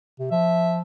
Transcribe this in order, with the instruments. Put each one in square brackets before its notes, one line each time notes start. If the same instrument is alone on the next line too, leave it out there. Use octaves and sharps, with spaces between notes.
[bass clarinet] C3
[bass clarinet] F3 [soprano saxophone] E5